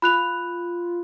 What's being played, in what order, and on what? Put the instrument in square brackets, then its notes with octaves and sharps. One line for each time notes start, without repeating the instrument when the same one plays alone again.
[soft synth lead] F4 [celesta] B5 F#6 F7